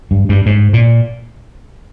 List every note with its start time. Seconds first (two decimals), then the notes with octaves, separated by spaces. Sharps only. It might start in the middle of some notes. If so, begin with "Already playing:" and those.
0.11 G2
0.29 G2
0.46 G#2
0.73 A#2